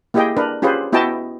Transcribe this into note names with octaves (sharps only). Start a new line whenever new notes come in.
A#3 E4 G4 G#4 D#5 G5
D4 A#4 B4
C#4 F4 G4 G#4 B4 C5
B3 E4 F#4 D#5 G5 A5